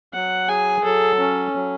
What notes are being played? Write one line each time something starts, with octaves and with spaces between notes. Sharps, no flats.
F#3 F#5
G#4 G#5
F#3 A4
C#4
F#3